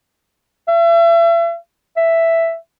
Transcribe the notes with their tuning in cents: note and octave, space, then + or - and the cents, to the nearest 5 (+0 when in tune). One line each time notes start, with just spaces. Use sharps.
E5 +40
E5 +5